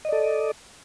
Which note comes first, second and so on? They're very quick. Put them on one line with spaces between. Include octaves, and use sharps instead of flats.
D#5 D5 A4